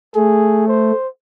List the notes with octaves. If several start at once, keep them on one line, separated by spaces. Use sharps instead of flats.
A3 G#4
C5